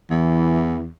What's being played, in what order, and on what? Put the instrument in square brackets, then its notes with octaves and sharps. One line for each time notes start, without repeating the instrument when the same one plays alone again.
[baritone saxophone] E2 [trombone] E3